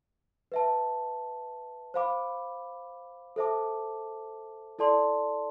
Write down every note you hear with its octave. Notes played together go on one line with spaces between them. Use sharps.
B4 E5 A5
C5 F5 B5 D6
A4 C5 E5 A5 D6
E4 A4 D5 A5 C6